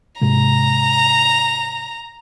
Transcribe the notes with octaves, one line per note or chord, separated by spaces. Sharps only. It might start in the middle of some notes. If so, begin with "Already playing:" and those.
G#2 C3 G#3 A#5